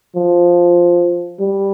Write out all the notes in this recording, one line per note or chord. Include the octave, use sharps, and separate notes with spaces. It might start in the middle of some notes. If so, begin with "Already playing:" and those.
F3
G3